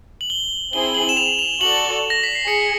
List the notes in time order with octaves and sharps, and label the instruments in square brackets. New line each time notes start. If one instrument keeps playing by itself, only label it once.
[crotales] F#7
G7
[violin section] C4 E4 G#4 [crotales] G7
[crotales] F#7
E7
F7
F7
[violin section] F#4 A4 D5 [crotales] F#7
[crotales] A#6
B6
C7
[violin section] G#4 [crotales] C#7